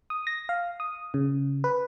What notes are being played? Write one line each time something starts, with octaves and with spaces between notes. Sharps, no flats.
D#6
A#6
F5
D#6
C#3
B4